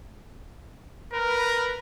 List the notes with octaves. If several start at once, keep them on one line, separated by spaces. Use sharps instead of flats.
A#4 B4